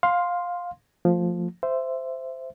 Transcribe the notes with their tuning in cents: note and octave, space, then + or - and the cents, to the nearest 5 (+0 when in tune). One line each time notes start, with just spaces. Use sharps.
F5 +15 C6 +0
F3 +5 A3 +30
C5 -10 E5 +15